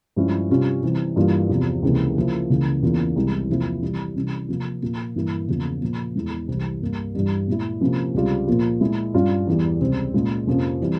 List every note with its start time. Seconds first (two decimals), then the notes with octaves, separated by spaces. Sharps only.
0.16 G2 F3 G#3 C#4 E4
0.50 C3 G3 C#4 F4
0.83 C3 E3 G3
1.16 G2 E3 G3 A#3 F4
1.49 E2 C3 F3
1.83 C#2 C3 E3 A#3
2.17 C#3 F3 A#3 E4
2.50 C#2 C#3 E3 A#3
2.83 E2 C#3 E3 A#3 F4
3.16 C2 C3 E3 G#3
3.48 E2 C3 F3 A#3 E4
3.83 C3 E3 G3
4.16 C3 E3 G3 C#4
4.49 C3 F3 A#3 F4
4.82 A#2 F3 A#3 F4
5.16 G2 E3 A#3 E4
5.48 E2 C#3 F3 A#3 F4
5.82 A#2 F3 A#3
6.15 E2 E3 G#3
6.48 C2 C3 E3
6.81 G2 G3 A#3
7.15 G2 E3 G3
7.47 A#2 G#3 E4
7.81 C3 F3 A#3 C#4
8.14 C#2 C3 G3 C4 F4
8.47 A#2 F3 A#3 F4
8.81 A#2 G#3 E4
9.14 G2 G3 C#4 F4
9.47 E2 E3 G3
9.81 C#2 C3 G3 C4
10.14 A#2 G#3 C#4 F4
10.47 F2 C3 F3 A#3 C#4
10.81 E3 G3 C4